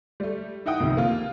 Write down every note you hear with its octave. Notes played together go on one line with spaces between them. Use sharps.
G3 A3
D#4 E4 F#5 G5 D#6
C2 F2 D#3
A#3 F4